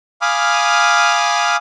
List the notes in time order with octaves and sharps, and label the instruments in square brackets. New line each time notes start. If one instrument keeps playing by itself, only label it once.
[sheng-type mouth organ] F5 G#5 B5 D6 D#6 F6